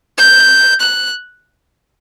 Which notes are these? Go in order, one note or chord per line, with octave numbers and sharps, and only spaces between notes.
G6
F#6